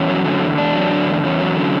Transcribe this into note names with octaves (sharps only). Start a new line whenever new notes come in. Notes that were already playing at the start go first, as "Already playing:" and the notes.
Already playing: E2 C#4
F#3
D3
E2
E2 D4
F#3
D3
E2
E2 C#4
F#3
D3